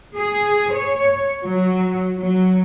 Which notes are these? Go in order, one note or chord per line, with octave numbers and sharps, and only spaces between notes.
G#4
C#5
F#3
F#3